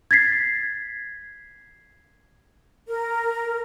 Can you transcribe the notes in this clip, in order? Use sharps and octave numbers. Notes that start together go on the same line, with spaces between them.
G#6 A6 B6 C7
A#4